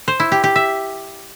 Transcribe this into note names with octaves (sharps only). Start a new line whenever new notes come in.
C5
E4
G4
G4
E5